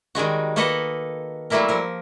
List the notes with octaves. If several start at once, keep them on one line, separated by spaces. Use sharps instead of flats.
D#3 G3 G#3 F#4
A#3 F#4 A4 B4 D#5 F#5
F#3 G3 A3 A#3 E4 A#4
F3 A#4